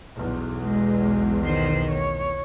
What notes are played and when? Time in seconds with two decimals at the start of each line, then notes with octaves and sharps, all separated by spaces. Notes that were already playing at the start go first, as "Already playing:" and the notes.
0.18 B1 E2
0.63 G#3
1.46 D#3 C5
1.92 C#5